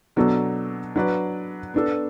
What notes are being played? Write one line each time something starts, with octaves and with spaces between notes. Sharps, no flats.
B2 F#3 D4 A4
F#3 D4 B4 D5
B3 D4 A4